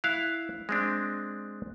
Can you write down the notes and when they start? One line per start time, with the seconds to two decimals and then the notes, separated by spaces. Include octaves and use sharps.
0.04 E4 F5 F#6
0.69 G#3 C4 D4